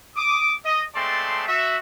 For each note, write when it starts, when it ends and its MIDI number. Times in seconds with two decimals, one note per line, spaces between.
0.16 0.54 86
0.16 0.54 87
0.65 0.84 75
0.95 1.46 56
0.95 1.46 57
0.95 1.46 60
0.95 1.46 74
0.95 1.46 81
0.95 1.46 84
1.48 1.77 66
1.48 1.77 76